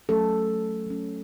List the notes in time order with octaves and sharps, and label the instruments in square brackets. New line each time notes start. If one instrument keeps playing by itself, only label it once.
[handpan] F#3 A3 C#4 A4
F#3 C#4